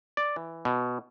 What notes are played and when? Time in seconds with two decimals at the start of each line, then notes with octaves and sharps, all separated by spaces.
0.17 D5
0.36 E3
0.65 B2